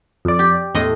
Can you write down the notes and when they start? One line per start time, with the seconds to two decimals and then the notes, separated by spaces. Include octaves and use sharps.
0.25 F2 D5
0.39 G4
0.75 E2 A2 D#5 C6